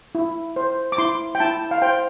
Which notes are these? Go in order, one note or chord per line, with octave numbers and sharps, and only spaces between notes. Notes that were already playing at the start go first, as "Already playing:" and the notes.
E4
C5
D6
E4 C6
G5
E4 A5
F5
C5 G5